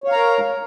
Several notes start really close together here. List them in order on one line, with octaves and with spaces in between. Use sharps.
C#5 F5 A#5 A#4